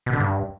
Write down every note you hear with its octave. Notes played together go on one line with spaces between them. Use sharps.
B2
D3
G2